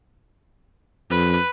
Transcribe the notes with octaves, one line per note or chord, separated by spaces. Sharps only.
F2 B4